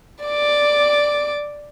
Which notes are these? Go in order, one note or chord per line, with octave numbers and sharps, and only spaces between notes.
D5 D6